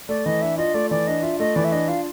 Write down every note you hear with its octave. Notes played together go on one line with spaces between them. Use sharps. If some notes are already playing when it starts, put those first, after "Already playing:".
A3 D5
E3 D#5
D4 E5
F4 D#5
A3 D5
E3 D5
D4 D#5
F4 E5
A3 D#5
E3 D5
E5
D4 D#5
F4 F5